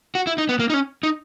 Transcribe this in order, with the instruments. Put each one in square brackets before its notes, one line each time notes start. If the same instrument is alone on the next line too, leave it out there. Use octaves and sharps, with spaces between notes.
[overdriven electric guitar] F#4
E4
D#4
B3
A#3
D#4
C#4
D#4